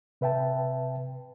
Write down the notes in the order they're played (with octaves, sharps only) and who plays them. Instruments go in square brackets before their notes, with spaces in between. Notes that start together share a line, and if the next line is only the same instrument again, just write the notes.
[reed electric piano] C3 B4 E5 G5 A5